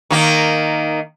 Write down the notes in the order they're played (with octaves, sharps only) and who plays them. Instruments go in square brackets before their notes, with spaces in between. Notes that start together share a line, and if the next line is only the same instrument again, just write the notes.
[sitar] D#3 A#3